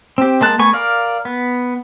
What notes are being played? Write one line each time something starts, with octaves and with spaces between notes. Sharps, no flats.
C4 G4
G#3 A#3 A5 F#6
A3 B3 B4 G#5 C#6
A#4 D5 F5
B3